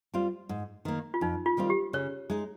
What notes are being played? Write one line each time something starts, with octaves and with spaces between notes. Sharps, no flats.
G3 C4 F4
G#2
D#3 A#3
F4
F2 D#4
F4
D#3 G3 C4 F4
G4
C#3 C#5
G#3 D#4